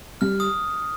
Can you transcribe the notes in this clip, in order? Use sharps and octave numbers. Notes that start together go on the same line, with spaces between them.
G3 F6
D#6